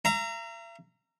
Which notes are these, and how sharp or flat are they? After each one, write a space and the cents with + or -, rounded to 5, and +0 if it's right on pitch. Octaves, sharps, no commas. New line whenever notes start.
E5 +45 A#5 -10